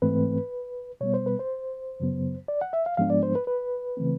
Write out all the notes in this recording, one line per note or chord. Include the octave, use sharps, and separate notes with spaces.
G#2 E3 A3 C4 B4
B2 G3 B3 C#5
C5
B4
C5
F#2 C#3 F#3 B3
D5
F#5
E5
F5
G#2 F3 G#3 B3 D4 F5
D5
C5
B4
B4
C#3 E3 A3 C4